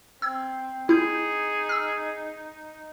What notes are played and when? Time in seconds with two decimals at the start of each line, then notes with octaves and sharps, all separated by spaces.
0.22 C4 E6 G#6
0.89 D#4 E4 G#4 G6
1.69 E6 F6